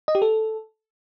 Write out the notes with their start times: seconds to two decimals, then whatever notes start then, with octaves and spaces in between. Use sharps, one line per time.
0.08 D#5
0.15 G4
0.22 A4